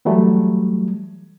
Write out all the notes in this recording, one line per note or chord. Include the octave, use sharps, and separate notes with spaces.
E3 F#3 G3 A3